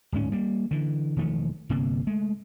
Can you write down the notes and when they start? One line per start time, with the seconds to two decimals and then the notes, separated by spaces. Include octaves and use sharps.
0.12 D1 G#2 C#4
0.32 G3 A#3
0.71 D3 E3
1.17 E1 D#3 F3 A3
1.69 G1 C3 A#3
2.07 G#3 A3